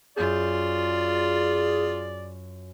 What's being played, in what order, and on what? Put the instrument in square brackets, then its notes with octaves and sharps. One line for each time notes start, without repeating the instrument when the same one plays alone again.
[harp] F#2 G6 [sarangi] F4 [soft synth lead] G#4 [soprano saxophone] D5